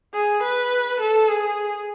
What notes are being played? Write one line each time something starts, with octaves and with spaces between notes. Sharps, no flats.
G#4
B4
A4
G#4